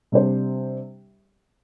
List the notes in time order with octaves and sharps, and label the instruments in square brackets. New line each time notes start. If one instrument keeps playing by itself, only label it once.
[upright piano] C3 G3 D4 G4 C5